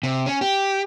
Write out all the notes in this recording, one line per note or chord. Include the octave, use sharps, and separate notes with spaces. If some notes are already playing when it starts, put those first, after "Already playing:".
C3
C#4
G4